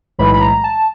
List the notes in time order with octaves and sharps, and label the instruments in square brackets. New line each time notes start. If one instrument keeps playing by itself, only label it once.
[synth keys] B1 A2 E3 G#3 B5
B5
A#5
A5